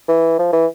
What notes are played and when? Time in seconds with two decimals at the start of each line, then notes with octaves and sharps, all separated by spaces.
0.08 E3
0.39 F3
0.53 E3